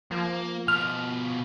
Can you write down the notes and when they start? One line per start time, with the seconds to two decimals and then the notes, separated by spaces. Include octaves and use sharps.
0.11 F3 A#3
0.68 B2 F4 F6